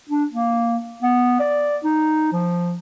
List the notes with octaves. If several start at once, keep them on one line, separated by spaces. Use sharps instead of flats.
D4
A#3
B3
D5
D#4
F3